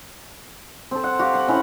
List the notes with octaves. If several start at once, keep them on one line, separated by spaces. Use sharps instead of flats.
C4 A4
F#5
F#4 G4 F5
F#5 C6
C#4 E4 C#5 F#5